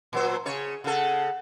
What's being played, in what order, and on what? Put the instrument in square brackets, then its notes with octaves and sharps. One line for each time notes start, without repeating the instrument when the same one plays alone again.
[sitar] A#2 F#3 C5
[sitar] C#3 C#5 [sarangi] G#4
[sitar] C#3 A4 [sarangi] F#5